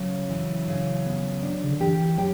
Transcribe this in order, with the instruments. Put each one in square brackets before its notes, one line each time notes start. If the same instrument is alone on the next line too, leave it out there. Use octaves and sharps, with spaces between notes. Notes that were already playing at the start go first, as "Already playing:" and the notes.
Already playing: [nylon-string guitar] C#3 C#4 [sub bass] F#3
[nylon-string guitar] E3
C#3
B3
D4
[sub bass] C#3
D3
[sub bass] E3 [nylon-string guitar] G4
[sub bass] F#3 [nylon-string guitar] G4